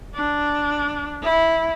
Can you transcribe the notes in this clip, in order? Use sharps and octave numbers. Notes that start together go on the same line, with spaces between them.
D4
E4